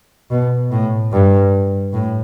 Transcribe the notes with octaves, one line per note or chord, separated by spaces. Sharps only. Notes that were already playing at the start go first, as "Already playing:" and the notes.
B2
A2
G2
A2